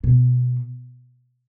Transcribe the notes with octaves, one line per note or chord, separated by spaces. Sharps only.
B2